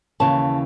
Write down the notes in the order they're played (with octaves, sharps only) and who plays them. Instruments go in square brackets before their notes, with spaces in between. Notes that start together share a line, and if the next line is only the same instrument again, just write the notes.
[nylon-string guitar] D#2 C#3 E3 A5